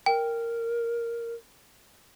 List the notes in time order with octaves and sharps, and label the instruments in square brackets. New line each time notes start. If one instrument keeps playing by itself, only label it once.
[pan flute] A#4 [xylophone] G5